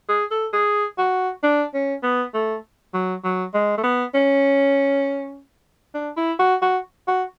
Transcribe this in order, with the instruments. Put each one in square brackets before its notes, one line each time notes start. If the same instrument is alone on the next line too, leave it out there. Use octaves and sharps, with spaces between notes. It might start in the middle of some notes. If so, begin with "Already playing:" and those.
[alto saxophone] G#4
A4
G#4
F#4
D4
C#4
B3
A3
F#3
F#3
G#3
A3
B3
C#4
D4
E4
F#4
F#4
F#4